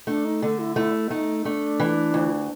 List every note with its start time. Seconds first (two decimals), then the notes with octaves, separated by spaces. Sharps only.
0.07 A3 D4
0.25 D#4
0.42 D3 A4
0.59 E4
0.76 A3 E4
1.10 A3 D#4
1.45 A3 D4
1.80 E3
2.14 D2